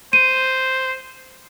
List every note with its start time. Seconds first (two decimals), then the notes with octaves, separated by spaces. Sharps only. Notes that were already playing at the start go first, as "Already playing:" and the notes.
0.13 C5 D#7